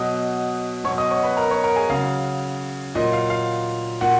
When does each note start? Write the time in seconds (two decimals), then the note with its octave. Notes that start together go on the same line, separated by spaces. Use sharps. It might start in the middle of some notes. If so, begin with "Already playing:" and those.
Already playing: B2 F#3 D#5 D#6
0.84 B2 C#5 C#6
0.88 F#3
0.98 D#5 D#6
1.11 C#5 C#6
1.23 B4 B5
1.37 A#4 A#5
1.51 C#5 C#6
1.64 A#4 A#5
1.76 G#4 G#5
1.89 C#3 F#3 F5
2.95 A#2 F#3 D#5
3.13 F5
3.30 F5
4.01 A#2 F#4 F#5